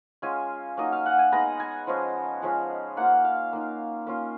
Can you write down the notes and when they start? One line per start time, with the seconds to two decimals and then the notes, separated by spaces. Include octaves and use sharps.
0.22 G#3 C#4 F4 G#5
0.77 F#3 A#3 D#4 D#5
0.92 F5
1.06 F#5
1.19 G#5
1.32 G#3 B3 D#4 A#5
1.60 G#5
1.87 F3 G#3 C#4
2.42 F3 G#3 C#4 F4
2.97 A#3 F4 F#5
3.25 F5
3.53 A#3 D#4
4.07 A#3 C#4 F4